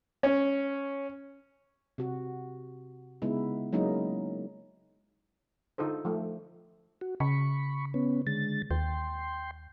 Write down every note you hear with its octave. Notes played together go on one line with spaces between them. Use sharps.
C#4
C3 F#4
C#3 G#3 B3 D#4 E4
F#3 G#3 A#3 C#4 D#4 E4
D3 D#4 F4 A4 C5
F3 A3
F#4
C#3 B5 C#6
B3 C#4
D3 G#3 A6
D#2 G5 C6